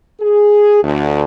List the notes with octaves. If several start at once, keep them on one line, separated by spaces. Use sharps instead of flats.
G#4
D2